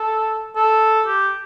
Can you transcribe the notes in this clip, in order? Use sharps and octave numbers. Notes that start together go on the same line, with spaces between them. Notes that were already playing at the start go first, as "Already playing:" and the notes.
Already playing: A4
A4
G4